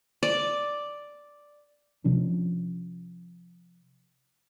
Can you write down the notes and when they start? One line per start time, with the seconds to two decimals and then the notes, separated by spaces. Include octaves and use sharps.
0.23 D5
2.04 C3 F3 C#4 D4